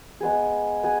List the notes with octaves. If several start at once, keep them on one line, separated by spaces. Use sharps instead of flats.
G#3 B3 G#4
B3 G#4